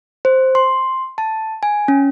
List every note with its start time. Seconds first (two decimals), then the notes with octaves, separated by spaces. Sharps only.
0.25 C5
0.55 C6
1.18 A5
1.63 G#5
1.88 C#4